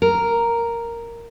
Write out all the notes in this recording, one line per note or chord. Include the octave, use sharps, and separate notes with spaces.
A#4